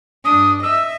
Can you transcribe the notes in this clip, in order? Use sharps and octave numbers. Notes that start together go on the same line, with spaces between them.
G2 D4 D#6
D#5 E5 E6